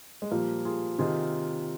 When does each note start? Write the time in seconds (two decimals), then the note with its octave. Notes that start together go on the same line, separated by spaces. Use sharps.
0.22 G#3
0.31 A#2 F3 G3 A#3
0.65 F4 G#4
0.99 C3 D#3 F4 G#4